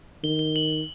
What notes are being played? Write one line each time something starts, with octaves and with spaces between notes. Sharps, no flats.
D#3 G7
G7
F#7